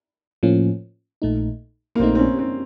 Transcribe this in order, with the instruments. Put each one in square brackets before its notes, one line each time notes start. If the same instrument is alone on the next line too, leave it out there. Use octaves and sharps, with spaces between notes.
[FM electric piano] A2 F3 A#3 C#4
A#1 A#2 A3 D#4
[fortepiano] A#3
[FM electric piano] A#1 A#2 A3 D#4 [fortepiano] C4
[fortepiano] C4
C#4
C4